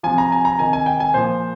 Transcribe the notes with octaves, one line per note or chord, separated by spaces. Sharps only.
C3 F3 G#5
A#5
G#5
A#5
C3 D#3 G#5
G#5
G5
G#5
A#2 F3 C5